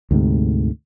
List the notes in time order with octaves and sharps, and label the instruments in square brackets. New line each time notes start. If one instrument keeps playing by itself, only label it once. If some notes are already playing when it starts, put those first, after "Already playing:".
[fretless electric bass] D2 G#2 C3